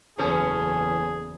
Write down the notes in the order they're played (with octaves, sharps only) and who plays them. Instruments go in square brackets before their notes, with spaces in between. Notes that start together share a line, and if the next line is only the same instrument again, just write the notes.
[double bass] F#1 E2 [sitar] E3 C#4 A4 [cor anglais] G#4